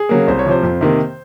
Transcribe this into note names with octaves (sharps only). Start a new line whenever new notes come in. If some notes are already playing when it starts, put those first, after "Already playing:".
Already playing: G#4
C#3 F#3 A#3
C2 C5
C#5
C3 F3 C5
F2
C3 D#3 A#3